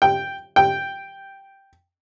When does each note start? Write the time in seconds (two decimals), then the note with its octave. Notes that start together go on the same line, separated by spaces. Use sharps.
0.02 G5
0.56 G5